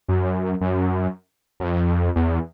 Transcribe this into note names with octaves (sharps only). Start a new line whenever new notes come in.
F#2
F#2
F#2
F2
E2